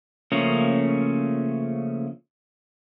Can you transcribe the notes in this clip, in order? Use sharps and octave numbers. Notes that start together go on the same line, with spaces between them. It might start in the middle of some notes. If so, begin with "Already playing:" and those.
C#3 F3 A3 A#3 C#4